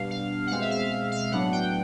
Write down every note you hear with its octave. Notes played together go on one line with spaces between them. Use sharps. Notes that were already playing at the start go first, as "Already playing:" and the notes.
Already playing: B2 G3 B3 D4 F5
F5
F#5
B2 G#3 C4 F5
E5
F5
F5
F5
F5
A2 F#3 B3 D4 F#5
G5